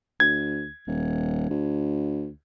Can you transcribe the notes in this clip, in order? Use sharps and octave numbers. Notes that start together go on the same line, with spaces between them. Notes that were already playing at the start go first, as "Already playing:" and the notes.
D2 G#6
D#1
D2